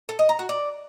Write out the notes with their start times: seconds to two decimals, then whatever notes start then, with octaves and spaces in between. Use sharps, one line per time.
0.09 A4
0.19 D#5
0.29 A#5
0.39 F#4
0.49 D5